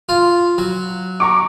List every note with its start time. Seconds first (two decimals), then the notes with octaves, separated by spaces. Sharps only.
0.09 F4
0.58 F#3
1.20 A#5 C#6 D6